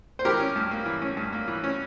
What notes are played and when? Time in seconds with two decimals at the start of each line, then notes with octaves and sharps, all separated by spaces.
0.19 C5
0.25 E3 G4 A#4
0.40 C#4
0.56 G2
0.71 A#3
0.86 E3
1.02 C#4
1.17 G2
1.33 A#3
1.48 E3
1.64 C#4